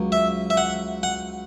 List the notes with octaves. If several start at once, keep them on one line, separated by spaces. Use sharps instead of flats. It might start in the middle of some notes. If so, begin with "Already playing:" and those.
Already playing: C#2 F#3
E5
E5
F#5
F#5